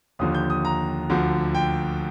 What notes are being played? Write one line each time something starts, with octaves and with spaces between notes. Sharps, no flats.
D#2 D3 F3 D#6
G6
D#6
A#5
D2 D3 F3
G5